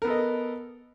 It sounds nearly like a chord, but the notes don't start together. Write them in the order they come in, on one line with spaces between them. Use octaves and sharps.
A#4 B3 A4 D#5